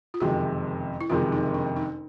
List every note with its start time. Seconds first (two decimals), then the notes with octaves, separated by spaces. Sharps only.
0.14 F4
0.20 F#1 F2 C3 D#3 G#3 F#4
1.01 E4
1.10 F#1 F2 C3 D#3 G#3 F4
1.32 D#4
1.54 D4
1.76 D#4